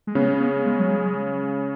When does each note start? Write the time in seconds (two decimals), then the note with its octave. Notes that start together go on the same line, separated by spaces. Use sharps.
0.07 G#3
0.15 C#3 B3 C#4
0.40 B3
0.66 G#3
0.79 F#3
0.91 G#3